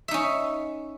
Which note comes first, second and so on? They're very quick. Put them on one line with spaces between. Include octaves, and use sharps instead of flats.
E5 D#4 C#4